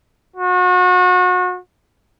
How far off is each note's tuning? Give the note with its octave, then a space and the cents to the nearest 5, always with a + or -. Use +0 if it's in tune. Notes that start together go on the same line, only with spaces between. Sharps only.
F#4 -35